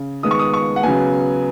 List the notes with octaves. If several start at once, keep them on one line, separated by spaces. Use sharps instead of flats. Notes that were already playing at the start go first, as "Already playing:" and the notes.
Already playing: C#3
D#3 G#3 B3 D#6
C#6
D#6
C#6
F#5
C#3 F#3 B3 G#5